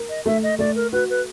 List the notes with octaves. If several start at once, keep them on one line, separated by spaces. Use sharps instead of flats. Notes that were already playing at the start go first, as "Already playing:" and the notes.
Already playing: A#4
D#5
A3 E5
D#5
A3 D5
A#4
F#4 B4
B4